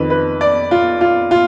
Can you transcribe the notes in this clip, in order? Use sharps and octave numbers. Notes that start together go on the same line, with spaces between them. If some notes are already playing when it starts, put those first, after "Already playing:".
Already playing: F2 D#3 B4
B4
D5
F4
F4
F4